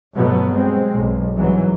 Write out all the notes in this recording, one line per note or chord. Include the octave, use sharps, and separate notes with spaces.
G1 G2 B2 F#3 A3 B3
G#3 C4
B1
C2 G#2 E3 F#3